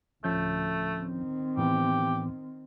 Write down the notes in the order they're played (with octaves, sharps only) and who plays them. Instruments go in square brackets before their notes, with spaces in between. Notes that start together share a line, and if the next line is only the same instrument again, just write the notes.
[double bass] D2 A2 [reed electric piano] F3 C#4 G6 [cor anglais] A3
[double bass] D#3 C4
[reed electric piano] A2 E3 B3 [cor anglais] G4